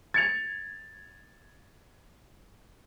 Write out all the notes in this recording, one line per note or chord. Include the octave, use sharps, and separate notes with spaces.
G#6 A6 C#7 F7